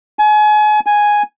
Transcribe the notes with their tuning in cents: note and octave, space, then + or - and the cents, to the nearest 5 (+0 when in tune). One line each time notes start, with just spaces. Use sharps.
G#5 +35
G#5 +0